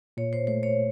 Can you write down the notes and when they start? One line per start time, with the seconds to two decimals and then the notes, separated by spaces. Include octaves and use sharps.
0.17 A#2 C#5
0.33 C5
0.47 A3 C5
0.63 C#5